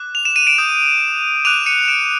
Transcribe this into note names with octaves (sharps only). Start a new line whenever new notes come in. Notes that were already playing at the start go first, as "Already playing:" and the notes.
Already playing: D6 F#6
F7
E7
D#7
D7 E7
D#6 G6
D6 F#6 D#7 F7
C#7 D#7
D7 E7